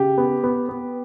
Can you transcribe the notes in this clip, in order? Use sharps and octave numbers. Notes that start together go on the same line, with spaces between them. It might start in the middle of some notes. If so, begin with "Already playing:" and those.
Already playing: C#3 G4
B3
B3
B3